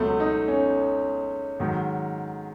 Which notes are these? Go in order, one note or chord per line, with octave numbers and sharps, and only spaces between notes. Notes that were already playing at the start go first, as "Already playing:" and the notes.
Already playing: C#2 B2 F#3 A3
D#4
C#4
G#2 D#3 F#3